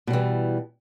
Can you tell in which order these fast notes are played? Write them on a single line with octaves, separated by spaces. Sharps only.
B2 G3 E3